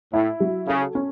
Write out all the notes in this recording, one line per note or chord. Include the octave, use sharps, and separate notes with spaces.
A2 E4
F#3
C#3 A4
C#4